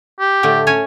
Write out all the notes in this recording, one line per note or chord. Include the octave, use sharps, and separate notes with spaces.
G4
A2 D3 A3
C#4 C#5 G#5